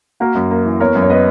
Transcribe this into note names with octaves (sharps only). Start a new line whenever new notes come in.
A#3 F#4 A#4
F#2
A#3
E3
B3 A#4 C#5
F#2
C#5
B3 B4 D#5